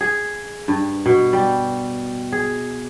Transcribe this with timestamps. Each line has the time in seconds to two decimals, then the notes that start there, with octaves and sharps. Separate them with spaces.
0.01 G#4
0.68 G2
1.06 B2
1.33 G3
2.32 G#4